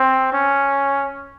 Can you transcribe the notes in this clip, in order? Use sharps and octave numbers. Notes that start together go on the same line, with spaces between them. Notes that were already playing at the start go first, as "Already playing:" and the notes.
Already playing: C4
C#4